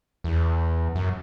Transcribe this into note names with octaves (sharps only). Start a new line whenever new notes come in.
E2
F#2